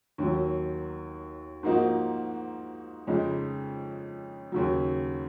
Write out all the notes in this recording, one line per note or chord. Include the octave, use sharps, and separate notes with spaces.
D#2 D#3 F#3
G#2 F3 A#3 D#4 F#4
F2 C#3 G#3 D#4
D#2 C#3 F#3